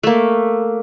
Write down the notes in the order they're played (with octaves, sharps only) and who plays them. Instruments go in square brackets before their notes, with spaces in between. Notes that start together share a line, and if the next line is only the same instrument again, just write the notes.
[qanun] A3 A#3